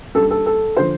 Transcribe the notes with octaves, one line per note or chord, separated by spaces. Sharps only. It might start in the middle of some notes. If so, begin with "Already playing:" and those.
G2 G3 A4
A4
A4
D3 F3 C5